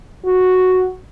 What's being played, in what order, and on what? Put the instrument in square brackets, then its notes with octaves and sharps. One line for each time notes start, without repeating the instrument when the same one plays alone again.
[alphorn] F#4